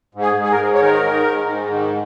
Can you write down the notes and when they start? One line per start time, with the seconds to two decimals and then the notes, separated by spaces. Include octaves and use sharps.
0.15 G#2
0.22 G#4
0.37 G#2
0.44 G#4
0.52 A#4
0.59 G#2
0.75 C#5
0.82 D#3 A#4
1.04 D#3
1.26 G#2
1.48 G#2
1.71 D#3